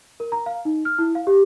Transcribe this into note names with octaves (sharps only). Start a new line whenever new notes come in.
A#4
A#5
F5
D#4
F6
E4
F5
G4